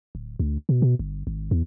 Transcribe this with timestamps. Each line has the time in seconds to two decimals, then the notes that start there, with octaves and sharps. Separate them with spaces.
0.15 D1
0.39 D2
0.69 B2
0.82 B2
0.99 G1
1.27 G#1
1.51 E2